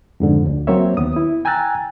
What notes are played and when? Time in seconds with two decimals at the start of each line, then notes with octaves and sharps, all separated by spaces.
0.20 F2 G#2 D3
0.45 D2
0.67 F#3 A#3 C4 C5 C#5 E5
0.97 D#2 B3 D#6
1.16 E4
1.45 G5 G#5 A#5 E6 F#6 A6